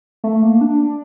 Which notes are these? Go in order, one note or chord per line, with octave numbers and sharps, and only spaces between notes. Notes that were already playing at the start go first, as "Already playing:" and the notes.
A3
A#3
D4